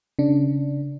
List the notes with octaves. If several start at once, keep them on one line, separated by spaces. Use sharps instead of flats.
C#3 D4